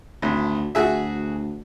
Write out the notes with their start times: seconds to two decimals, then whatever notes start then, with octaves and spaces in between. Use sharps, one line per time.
0.22 G#1 D2
0.75 D2 F#4 G#4 E5